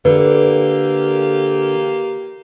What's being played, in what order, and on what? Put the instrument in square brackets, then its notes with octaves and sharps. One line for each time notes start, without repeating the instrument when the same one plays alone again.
[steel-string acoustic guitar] D3 [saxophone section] A#3 F4 G4 [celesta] B4